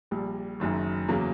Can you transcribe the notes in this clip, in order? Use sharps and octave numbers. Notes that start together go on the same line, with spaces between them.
A#1 A#2 G3
F#1 F#2 D#3
E2 C#3 F#3 A#3